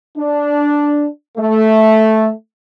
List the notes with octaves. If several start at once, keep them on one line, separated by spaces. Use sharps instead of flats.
D4
A3